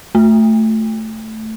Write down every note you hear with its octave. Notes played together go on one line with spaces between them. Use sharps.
A3